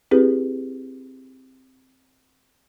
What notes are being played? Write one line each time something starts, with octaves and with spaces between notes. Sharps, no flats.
C4 E4 G4 G#4 B4